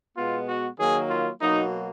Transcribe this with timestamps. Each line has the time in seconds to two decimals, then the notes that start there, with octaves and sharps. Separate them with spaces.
0.17 B2 G#3 B3 F4
0.49 F#4
0.79 D#3 F#3 A#3 G#4
1.10 F4
1.41 B2 F#3 A#3 D#4